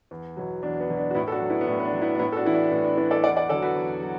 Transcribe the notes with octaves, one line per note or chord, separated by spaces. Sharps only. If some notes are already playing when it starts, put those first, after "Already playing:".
E2
B2 F#3
E2 D4
B3
B2 F#3
D4
F#4
A2 B3 E4
A4
D4 F#4
F#3
B3 E4
B3
A2 D4
B3
D4
F#3
B3 E4
D4
A2 B3 E4
A4
D4 F#4
E3 E4
D4
A2 B3
D4
E3 D4
A4 D5
E2 D5 F#5
D5 F#5
D3 F#3 A4 D5
F#4 B4
E2
F#3